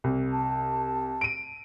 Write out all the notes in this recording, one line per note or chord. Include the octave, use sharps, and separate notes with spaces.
C2
A5
D7 D#7